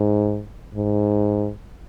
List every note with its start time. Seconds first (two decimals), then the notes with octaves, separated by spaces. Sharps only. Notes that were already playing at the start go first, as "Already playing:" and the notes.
Already playing: G#2
0.75 G#2